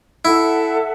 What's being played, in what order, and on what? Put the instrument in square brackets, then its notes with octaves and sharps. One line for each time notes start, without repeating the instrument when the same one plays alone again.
[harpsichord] E4 [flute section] A4 E5 F#5